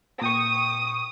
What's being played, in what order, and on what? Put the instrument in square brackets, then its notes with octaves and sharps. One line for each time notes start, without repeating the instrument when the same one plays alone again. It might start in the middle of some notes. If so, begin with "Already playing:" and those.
[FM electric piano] A#2 G5 C#6 [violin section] D#6